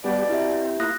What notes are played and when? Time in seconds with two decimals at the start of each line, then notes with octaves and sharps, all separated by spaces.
0.04 B2 G3 B3 G4 D5
0.29 C4 E4 G4 E5
0.80 A#3 E4 F4 D#6 F#6 A#6